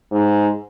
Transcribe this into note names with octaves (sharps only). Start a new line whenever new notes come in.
G#2